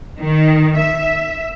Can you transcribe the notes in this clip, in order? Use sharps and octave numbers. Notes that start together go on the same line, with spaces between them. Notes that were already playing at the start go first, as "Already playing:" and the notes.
D#3
E5